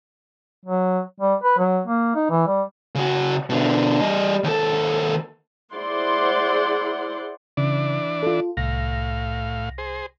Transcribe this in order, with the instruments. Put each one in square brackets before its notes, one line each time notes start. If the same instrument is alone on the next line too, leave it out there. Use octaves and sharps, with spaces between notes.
[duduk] F#3
G3
B4
F#3
A#3
D#4
E3
G3
[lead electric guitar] C#3 F#4
B2 D3
G3 D#5
D#2 A4
[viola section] E4 G#4 C5 D5 F#5 C6
[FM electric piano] C#3 [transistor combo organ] E3 D4 D5
[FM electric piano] F4 A4
[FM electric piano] C2 A#6 [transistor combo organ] A2 F5
[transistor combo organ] G#4 C5